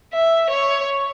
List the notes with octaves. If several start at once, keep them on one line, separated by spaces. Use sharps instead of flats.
E5
C#5